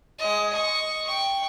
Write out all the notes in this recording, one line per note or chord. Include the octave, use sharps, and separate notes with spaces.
G#3 D#5
D#5 C#6
G5 C#6